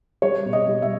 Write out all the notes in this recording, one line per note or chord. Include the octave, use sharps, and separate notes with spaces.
G3 C#5
B2
D#5
G3
E5